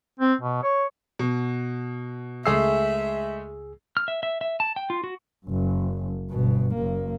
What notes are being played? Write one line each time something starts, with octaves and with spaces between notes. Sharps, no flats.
C4
B2
C#5
B2
C#2 G#3 A3 G#4 E5 E6 C7
F6
E5
E5
E5
A5
G5
F4
F#4
F#1 F#2
G1 B2
F#1 A#3